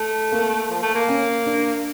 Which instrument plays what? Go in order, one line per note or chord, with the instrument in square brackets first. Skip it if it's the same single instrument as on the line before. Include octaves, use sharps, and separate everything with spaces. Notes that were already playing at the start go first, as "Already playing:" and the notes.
Already playing: [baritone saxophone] A3
[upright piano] A#3
[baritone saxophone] F3
A3
A#3
[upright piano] C#4
D4